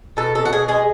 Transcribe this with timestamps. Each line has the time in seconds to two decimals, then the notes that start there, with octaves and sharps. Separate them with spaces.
0.17 B2 A4
0.35 B2 A4
0.45 F#4
0.52 B2 G#4
0.68 G#3 G#4